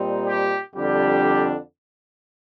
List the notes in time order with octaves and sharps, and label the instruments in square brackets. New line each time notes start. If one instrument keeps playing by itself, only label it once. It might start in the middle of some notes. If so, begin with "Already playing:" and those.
Already playing: [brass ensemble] A#2 G3 C4 D#4
G4
F2 D3 G3 D4 G4